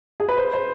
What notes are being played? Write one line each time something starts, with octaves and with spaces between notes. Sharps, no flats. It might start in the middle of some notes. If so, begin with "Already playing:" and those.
G#4
B4
C5
C5